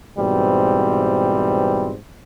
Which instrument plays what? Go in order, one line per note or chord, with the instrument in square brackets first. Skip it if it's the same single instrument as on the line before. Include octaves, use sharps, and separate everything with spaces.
[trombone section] G#2 B2 E3 G3 C4